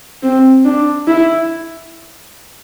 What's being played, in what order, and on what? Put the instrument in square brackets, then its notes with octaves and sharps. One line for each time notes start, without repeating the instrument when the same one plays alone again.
[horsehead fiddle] C4
D4
E4